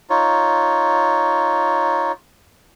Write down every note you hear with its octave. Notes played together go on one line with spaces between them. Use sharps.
D#4 F4 C#5